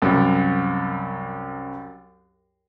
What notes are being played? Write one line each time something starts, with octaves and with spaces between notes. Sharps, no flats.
C2 F#2